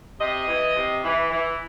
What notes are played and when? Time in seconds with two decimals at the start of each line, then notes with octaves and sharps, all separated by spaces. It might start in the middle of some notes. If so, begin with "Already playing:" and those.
0.20 C3 D#5
0.47 E3
0.76 C3
1.03 E3
1.30 E3